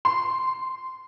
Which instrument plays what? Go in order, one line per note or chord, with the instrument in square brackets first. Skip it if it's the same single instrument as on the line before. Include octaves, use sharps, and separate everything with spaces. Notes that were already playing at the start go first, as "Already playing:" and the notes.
[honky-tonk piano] C6